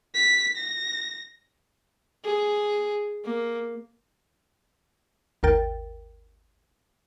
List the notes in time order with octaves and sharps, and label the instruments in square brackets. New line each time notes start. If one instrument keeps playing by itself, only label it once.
[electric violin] B6
A#6
[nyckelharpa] G#4
A#3
[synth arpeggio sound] G#1 D#2 A#4 G5 A6